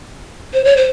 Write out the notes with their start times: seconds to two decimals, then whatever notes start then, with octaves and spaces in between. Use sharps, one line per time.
0.53 C5
0.65 C#5
0.77 C5